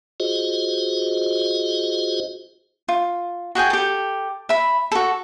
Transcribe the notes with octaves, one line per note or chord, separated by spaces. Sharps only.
F4 F#4 G#4 C5 D#5
F4
F#4 G#4 G5 G#5
G4 A4
E5 B5
F#4 A4